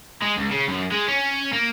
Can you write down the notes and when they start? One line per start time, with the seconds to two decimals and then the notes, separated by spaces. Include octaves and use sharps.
0.22 G#3
0.38 C#2
0.52 C#3
0.69 F#2
0.92 G#3
1.08 C#4
1.53 A#3